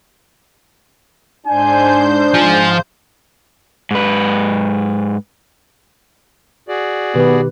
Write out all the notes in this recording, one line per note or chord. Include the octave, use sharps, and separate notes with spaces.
G#2 D4 C5 G#5 G6
F3 G#5
G#2 B4
F#4 G#4 D5
B2 D#3 B3 G4 B4